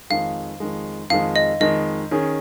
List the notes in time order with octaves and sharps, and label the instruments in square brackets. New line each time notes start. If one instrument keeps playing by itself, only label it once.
[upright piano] F2 D#3 G#3 [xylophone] F5
[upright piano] F2 D#3 G#3
[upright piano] F2 D#3 G#3 [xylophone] F5
[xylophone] D#5
[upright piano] F2 D#3 G#3 [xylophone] D#5
[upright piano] D#3 C#4 G#4